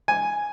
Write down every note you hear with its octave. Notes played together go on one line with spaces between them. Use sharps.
G#5